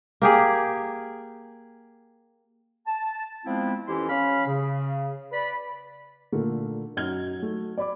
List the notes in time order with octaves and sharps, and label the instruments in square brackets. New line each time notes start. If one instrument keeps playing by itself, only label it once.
[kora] A#3 G4 G#4
[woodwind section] A5
F3 G#3 B3 C4 E4
F2 E3 C#4 E4 G4 C6
C#4 F5 B5
C#3
B4 D5 B5
[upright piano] A#2 D3 A3 A#3
F#2 D#4 F#4 F6 G#6 G7
F#3 A3
D5 B5 D6